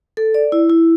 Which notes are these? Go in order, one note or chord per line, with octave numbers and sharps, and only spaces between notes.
A4
D5
E4
E4